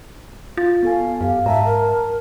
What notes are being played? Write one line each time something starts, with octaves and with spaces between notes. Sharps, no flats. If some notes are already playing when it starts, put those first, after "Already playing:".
F4 A6
B3 A4 F5 G#5
F#2 G4 F5
G#2 E5 F#5 A5 A#5
A#4